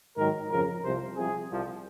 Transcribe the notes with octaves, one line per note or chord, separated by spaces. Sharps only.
G#2 D#3 F#3 A#4
F2 C#3 F3 A#4
C2 C3 F3 C5
C2 C3 F3 G#4
C2 C3 F3